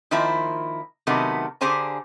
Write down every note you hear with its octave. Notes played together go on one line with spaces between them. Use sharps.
D#3 F3 A#3 E4 C5
C3 D#3 F#3 A3 B3
D3 G4 G#4 C5 G#5 A#5